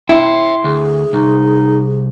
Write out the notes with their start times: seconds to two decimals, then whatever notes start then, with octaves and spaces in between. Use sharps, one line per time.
0.09 E4 E5 G5 C6
0.64 D2 G#4
1.13 C2 D#4